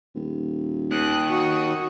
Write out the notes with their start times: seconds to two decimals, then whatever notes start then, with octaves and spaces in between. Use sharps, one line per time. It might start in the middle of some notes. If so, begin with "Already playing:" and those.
0.15 D#1
0.91 D#2 D#6 F#6
1.29 F#4 C#6 D#6